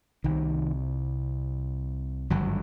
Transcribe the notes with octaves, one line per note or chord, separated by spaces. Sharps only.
C2 C3 D#3
G#1 G2 D3 F#3